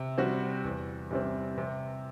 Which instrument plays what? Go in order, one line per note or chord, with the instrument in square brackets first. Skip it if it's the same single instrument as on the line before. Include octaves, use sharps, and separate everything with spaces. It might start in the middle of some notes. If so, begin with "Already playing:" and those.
Already playing: [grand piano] C3
G3 C4 F#4
E2
C3 G3 C4
C3